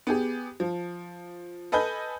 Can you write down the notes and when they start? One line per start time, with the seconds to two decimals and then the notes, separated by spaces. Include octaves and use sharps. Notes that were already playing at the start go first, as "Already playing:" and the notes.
0.07 B3 G4 G#4
0.60 F3
1.72 A4 B4 D#5 G#5 B5 G6